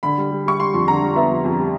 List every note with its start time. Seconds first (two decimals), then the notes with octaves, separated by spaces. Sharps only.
0.03 D3 B5
0.18 G3
0.31 G3
0.46 G3 C#6
0.59 G3 C6
0.74 F2
0.88 D3 A#5
1.02 G3
1.16 B3 E5
1.30 F2
1.44 F2
1.59 G3